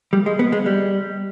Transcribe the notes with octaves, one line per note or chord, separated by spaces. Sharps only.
G3
G#3
B3
G#3
G3